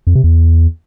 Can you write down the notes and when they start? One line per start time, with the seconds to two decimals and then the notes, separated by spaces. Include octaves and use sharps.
0.07 F2
0.15 C3
0.24 E2